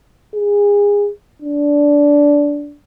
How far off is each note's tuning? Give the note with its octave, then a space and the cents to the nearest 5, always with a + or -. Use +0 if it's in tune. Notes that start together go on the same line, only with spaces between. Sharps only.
G#4 -25
D4 -15